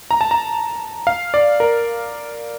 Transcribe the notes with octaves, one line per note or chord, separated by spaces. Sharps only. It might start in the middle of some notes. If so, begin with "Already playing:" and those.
A#5
A5
A#5
F5
D5
A#4